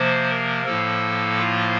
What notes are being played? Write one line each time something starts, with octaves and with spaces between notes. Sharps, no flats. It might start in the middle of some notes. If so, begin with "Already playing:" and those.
Already playing: C3 F3 A#3 C5
A#4
A2 F3 A#3 A4
F4